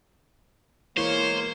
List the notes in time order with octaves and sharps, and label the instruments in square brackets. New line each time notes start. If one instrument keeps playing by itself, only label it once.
[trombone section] B2 G#3 A#3 [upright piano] E3 [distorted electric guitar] C5 [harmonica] C#5